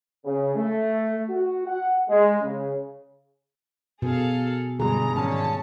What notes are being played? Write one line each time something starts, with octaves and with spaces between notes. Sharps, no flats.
C#3
A3
F#4
F#5
G#3
C#3
B2 G#4 A4 F5
G2 B2 D3 E3 G#3 G#4 A#5
G#2 D3 D#3 C#4 A5